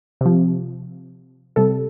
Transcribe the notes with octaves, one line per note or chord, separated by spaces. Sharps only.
C3 F3
C3 G3 A4